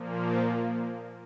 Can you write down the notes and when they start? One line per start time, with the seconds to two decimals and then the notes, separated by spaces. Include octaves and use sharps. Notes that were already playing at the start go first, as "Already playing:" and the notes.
Already playing: A#2 F3 A#3